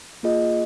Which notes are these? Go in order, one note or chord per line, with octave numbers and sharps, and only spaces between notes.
A#3 F4 G#4 D#5